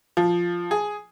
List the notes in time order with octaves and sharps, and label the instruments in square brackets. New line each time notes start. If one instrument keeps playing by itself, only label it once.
[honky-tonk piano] F3
G#4